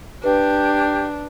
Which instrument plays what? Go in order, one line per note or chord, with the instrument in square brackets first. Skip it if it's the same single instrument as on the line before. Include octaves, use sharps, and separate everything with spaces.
[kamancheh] D4 [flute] G4 [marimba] B4